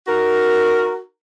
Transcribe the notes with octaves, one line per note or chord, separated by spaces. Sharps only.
D#4 F#4 A#4